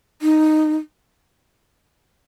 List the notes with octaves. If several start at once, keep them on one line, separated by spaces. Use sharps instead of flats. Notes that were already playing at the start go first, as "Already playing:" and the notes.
D#4